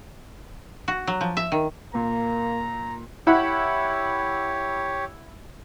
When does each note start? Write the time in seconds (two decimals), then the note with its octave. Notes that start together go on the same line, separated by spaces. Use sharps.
0.88 F#4
1.07 F#3
1.21 F3
1.37 E5
1.52 D#3
1.95 A#2 A#3 A#5
3.27 E4 G4 C#5 F#5 B5